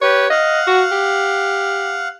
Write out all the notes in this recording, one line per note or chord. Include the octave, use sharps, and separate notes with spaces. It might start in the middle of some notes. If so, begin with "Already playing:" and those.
G4 B4 C#5
D#5 F5 F#5
F#4
G4